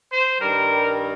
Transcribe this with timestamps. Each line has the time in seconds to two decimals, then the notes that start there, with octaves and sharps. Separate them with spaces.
0.11 C5
0.40 G2 D#3 G3 A#4